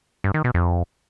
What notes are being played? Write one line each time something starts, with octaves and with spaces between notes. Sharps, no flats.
G2
D#3
B2
F2